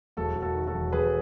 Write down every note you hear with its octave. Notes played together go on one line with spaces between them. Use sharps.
E1 F#4 A4
E1
F#4 A4
D#3
F#4 A4
E1
E1 G#4 B4